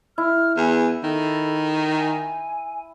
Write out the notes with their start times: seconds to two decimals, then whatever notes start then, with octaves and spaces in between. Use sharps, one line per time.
0.18 E4 F6
0.57 E2 G#5
1.04 D#3 A4
1.98 G#5